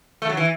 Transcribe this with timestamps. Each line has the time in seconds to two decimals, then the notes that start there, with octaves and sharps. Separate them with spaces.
0.22 A3
0.29 F#3
0.37 E3